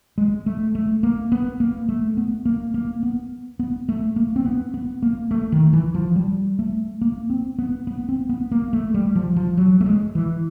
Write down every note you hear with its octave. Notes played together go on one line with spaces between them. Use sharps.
G#3
A3
A3
A#3
B3
A#3
A3
B3
A#3
A#3
B3
B3
A3
A#3
C4
B3
B3
A#3
A3
D#3
E3
F3
G3
A3
A#3
C4
B3
B3
C4
B3
A#3
A3
G3
F3
F3
F#3
A3
G#3
E3